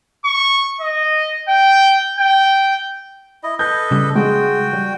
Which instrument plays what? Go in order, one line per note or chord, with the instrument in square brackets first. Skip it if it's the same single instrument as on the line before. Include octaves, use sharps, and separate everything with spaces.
[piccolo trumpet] C#6
D#5
G5
G5
[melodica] E4 D#5
[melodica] A4 B4 D#5 [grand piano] G6
[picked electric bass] C#3 G3
[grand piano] G#3 [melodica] F#4 G5
[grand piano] G3